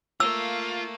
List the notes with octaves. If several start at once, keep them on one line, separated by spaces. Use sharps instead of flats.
A3 A#3 F4 E6